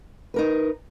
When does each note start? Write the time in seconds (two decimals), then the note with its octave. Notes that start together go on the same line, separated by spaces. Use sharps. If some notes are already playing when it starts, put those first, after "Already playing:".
0.34 D#4 A#4 B4